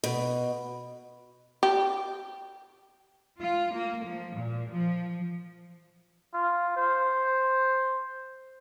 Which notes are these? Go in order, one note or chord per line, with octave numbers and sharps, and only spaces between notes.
B2
G4
F4
A#3
F3
A#2
F3
F4
C5